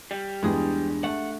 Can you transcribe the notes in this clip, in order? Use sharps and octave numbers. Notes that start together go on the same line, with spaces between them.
G3
E2 G2 G#3 G#4
A3 F#5